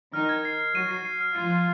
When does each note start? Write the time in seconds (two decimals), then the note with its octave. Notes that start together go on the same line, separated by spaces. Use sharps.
0.14 D#3 D#4 F6
0.29 G#6
0.45 C7
0.60 C7
0.75 F#3 F#4 D#7
0.91 C7
1.05 C7
1.21 F6
1.36 F3 F4 C7
1.51 F6